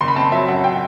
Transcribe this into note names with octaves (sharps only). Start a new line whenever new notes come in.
F#1 C6
B5
C4 A5
F#3 E5
F#2 F#5
G5